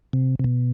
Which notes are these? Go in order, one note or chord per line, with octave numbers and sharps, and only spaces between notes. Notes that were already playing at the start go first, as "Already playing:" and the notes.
C3
C3
B2